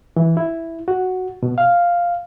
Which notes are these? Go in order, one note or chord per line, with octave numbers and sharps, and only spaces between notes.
E3
E4
F#4
B2
F5